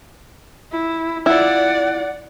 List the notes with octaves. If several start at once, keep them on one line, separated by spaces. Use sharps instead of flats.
E4
E4 F4 D5 F#5